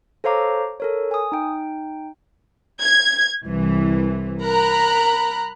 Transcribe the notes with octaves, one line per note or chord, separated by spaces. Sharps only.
A4 C5 C#5 F5 A#5 D6
A4 A#4 C#5
G#5 D#6
D#4 G5
G#6
C2 E3
A#4 A#5 B5 F#6